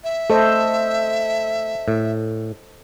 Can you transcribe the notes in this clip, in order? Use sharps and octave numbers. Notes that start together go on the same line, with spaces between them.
E5
A3 A4 C5 D#5
A2